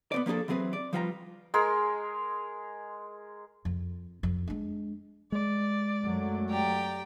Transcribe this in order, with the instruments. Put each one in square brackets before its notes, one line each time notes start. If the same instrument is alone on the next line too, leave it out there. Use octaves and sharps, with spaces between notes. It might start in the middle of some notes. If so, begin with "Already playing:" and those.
[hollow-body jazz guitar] B3 C4 D5
F3 A#3 D4 G#4 A4
E3 F#3 C4 G#4 B4
D5
F3 G3 F4 B4 F5 A#5
[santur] G#3 G#4 A#4
[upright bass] F2
F2
G#3 D4
[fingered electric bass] G#3 [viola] D5
[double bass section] F#2 F#3 A3
[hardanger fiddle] G4 G5 [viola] D5 A#5